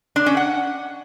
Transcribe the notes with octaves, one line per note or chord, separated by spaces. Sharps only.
D4
C#4
F#5